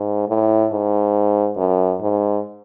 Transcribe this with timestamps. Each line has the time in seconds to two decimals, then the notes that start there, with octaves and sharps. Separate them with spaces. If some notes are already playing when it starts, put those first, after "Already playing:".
Already playing: G#2
0.29 A2
0.73 G#2
1.57 F#2
2.01 G#2